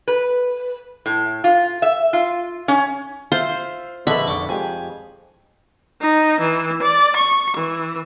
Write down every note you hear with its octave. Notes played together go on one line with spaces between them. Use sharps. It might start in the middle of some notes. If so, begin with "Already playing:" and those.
B4
A2
F4
E5
F4
C#4
F4 C5 E5 F5
A#1 D3 A4 B4 D#5 E5 B5 C#6
F1 G5 C#6 D6
F2 G#3 G4 G#5
D#4
E3
D5
C#6
E3